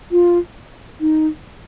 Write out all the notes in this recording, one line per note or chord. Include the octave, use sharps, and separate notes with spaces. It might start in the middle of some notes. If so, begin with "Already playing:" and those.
F4
D#4